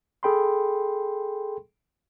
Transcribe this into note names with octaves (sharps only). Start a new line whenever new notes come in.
G#4 A4 G5 B5 C6